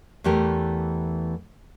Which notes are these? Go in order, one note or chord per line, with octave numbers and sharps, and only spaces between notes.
E2 E3 A3 G4 A#4